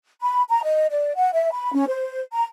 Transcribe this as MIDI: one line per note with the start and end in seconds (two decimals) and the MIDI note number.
0.21 0.42 83
0.49 0.62 82
0.63 0.86 75
0.90 1.13 74
1.15 1.29 78
1.34 1.50 76
1.53 1.72 83
1.73 1.86 61
1.88 2.20 72
2.33 2.45 82